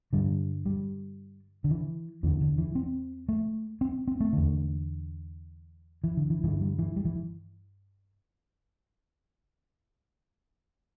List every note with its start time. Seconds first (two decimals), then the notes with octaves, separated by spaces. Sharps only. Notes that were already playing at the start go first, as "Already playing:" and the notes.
0.13 G2 D3 G3
0.66 G3
1.64 D3
1.71 E3
2.23 E2 D3 E3
2.41 D3
2.58 E3
2.75 C4
3.29 A3
3.81 C4
4.08 C4
4.20 A3
4.33 E2 D3
6.04 E3
6.17 D3
6.30 E3
6.44 G2 D3 E3
6.61 G3
6.79 E3
6.96 G3
7.05 E3